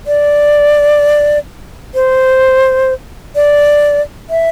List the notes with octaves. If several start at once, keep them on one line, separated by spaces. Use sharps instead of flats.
D5
C5
D5
E5